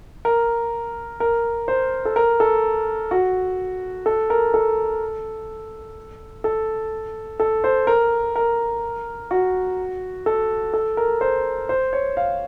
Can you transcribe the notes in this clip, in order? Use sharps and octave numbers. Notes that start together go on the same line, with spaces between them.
A#4
A#4
C5
A4
A#4
A4
F#4
A4
A#4
A4
A4
A4
C5
A#4
A#4
F#4
A4
A4
A#4
C5
C5
C#5
F5